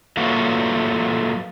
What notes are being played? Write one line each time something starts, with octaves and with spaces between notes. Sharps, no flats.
F#3 A3 A#3 F4 F#4 B4